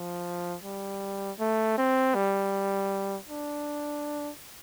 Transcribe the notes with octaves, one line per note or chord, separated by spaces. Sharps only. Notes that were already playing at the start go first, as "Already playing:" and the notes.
Already playing: F3
G3
A3
C4
G3
D4